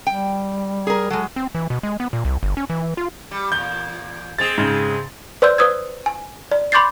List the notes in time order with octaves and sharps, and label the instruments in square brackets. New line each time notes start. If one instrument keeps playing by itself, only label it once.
[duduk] G3 [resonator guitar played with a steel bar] G5
[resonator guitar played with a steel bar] G#4 A#4
[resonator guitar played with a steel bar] F#3 G#3 [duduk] A4
[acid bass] C4
E3
B2
G#3
B3
A#2
C2
G1
C#4
E3
F4
[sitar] G3
[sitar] E2 A#2 [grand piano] G6 G7
[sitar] G#3 C4 G#4 [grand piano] A6 F7
[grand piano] G#2 C#3
[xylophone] B4 C5 D5 C6 E6 G6
B4 C5 D#6 E6 G#6
G#5
D5
B5 C6 D6 G6 A6 C7